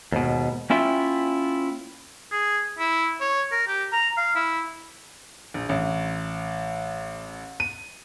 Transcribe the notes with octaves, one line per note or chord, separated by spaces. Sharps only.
D#2 G#2 B2
A#3 C#4 E4 F4 E5 G5
G#4
E4
C#5
A#4
G4
A#5
F5
E4
A#1
A1
D#7